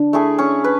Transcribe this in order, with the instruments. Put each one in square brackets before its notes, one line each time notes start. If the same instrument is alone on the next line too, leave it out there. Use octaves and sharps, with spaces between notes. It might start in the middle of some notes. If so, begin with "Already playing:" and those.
Already playing: [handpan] D4
[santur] A3 E4 G#4
C#4
B4